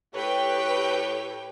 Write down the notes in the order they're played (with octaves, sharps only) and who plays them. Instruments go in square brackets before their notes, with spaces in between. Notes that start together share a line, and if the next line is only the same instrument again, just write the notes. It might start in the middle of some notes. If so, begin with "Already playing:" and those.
[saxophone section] A2 A4 C#5 [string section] G4 B4 G5